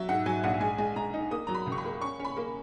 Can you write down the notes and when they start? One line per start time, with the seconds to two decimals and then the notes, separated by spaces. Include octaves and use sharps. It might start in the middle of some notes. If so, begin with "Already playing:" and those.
Already playing: F#3 E5
0.08 G#2 F#5
0.26 F#3 G#5
0.43 A#1 F#5
0.61 G#3 G#5
0.78 G#3
0.96 G#3 A#5
1.14 D#4
1.31 A#3 D#6
1.47 F#3 A#5
1.55 B5
1.67 C#2
1.72 C#6
1.78 B5
1.84 A#3
2.01 C#4 C#6
2.19 C#4
2.25 B5
2.37 A#3